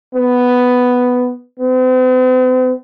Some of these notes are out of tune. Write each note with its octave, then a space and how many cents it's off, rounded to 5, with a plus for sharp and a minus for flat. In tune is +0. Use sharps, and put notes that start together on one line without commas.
B3 +5
C4 -45